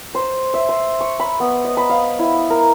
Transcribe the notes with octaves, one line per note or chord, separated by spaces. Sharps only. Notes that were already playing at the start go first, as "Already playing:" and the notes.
C5
E5
C5
C#6
B5
B3
D#5
B5
F5
E4
A#4